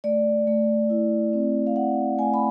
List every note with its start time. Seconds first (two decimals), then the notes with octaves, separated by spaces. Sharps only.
0.04 A3 D5
0.47 A3
0.90 E4
1.33 C4
1.67 F5
1.76 A3 F#5
2.18 A3 G#5
2.34 B5